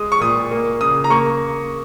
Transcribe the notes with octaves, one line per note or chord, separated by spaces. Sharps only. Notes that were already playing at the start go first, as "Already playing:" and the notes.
Already playing: G#3 D#6
C#6
A#2 D#6
A#3
C#3 D#6
A#5
A#3 C#6